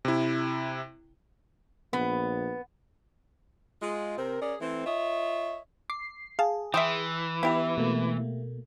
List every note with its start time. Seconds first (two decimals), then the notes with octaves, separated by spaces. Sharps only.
0.05 C3 E4
1.93 A#1 B3
3.82 G#3 F4
4.18 C3 C4 A#4
4.42 C#4 G#4 A#4 D5
4.61 E3 A3 C4
4.86 F4 C#5 D#5 E5
5.90 D6 C7
6.39 G#4 F5 A5
6.74 E3 E5 G5 C6 D#6
7.43 B3 E4 G4 B4
7.77 B2 A3 A#3